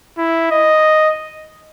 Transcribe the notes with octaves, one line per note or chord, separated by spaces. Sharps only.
E4
D#5